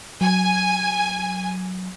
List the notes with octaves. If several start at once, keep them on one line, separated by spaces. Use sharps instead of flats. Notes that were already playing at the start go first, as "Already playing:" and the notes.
F#3 G#5